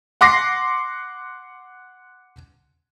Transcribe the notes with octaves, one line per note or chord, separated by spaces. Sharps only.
F#5 C6 D6 A#6 C7